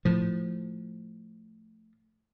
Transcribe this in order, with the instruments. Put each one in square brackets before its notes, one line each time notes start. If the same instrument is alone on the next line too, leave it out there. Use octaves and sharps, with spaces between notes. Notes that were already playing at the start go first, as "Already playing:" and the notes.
[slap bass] A2 F3